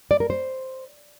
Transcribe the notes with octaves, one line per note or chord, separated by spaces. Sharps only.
D5
A#4
C5